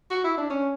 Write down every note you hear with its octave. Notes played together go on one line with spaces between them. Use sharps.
F#4
E4
D4
C#4